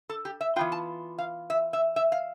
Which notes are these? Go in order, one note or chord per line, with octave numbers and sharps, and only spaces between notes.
A4
G4
E5
E3 B3 F4 G5
A5
F5
E5
E5
E5
F5